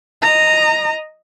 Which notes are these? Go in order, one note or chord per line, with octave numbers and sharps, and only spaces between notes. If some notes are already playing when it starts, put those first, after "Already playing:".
D#5 A#5